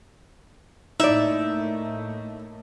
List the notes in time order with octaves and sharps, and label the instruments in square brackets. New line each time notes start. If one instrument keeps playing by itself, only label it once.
[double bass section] A2 A3 A#3 [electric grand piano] D#4 [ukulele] E4 D5 [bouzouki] E5